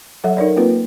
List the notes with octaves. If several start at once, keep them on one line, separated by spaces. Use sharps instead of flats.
F#3 A4 C#5 E5 F#5
D#4 A#4 C#5 D5
A#3 C4 F4 B4